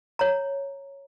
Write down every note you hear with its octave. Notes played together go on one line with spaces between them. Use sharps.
C#5 A#5